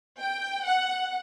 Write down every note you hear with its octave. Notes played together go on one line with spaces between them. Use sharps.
G5
F#5